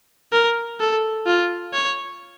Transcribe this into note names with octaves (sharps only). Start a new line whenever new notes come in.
A#4
A4
F4
C#5